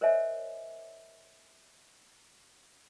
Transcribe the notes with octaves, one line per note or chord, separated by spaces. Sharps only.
A#4 C5 C#5 D#5 E5 G#5